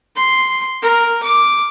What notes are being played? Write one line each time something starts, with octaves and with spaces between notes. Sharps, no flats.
C6
A#4
D6